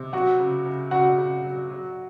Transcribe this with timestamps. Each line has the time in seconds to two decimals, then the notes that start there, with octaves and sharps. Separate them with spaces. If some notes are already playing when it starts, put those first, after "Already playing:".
Already playing: C3
0.13 F#3 F#4 F#5
0.40 C#3
0.66 C#3
0.91 C#3 F#4 F#5
1.18 C#3
1.44 F#3
1.70 F#3